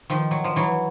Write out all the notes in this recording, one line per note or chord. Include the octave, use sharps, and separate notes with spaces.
D#3 F3
F#3
F3
E3 F#3